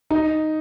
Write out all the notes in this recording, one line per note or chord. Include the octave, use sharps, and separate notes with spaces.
D#4